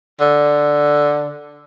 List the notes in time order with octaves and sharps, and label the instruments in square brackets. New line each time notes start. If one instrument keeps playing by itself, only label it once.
[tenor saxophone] D3